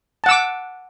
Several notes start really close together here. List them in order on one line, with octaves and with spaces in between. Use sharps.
A5 F#5 E6 D6